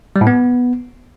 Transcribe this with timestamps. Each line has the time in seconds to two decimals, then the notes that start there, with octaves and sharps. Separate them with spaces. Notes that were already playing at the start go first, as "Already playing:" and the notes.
0.16 G3
0.21 A2
0.27 B3